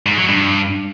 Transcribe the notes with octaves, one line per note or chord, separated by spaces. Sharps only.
G#2
F#3
G2